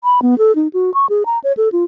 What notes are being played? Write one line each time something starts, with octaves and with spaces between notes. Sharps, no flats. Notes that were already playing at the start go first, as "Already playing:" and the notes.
B5
B3
A4
D#4
F#4
C#6
G#4
A#5
C#5
A4
F4